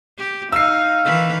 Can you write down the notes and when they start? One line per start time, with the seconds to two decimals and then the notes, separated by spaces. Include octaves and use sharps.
0.18 G4
0.52 D#4 F5 E6 C7
1.05 D#3 E3 B4